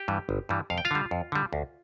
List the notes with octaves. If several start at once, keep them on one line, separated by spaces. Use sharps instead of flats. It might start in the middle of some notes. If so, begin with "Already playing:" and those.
Already playing: G4 G5
G2 E3 G3
G1
G2 E3 G3
F2 F5
G5
F4 F5
D3 G3
F2
D3 G3
D2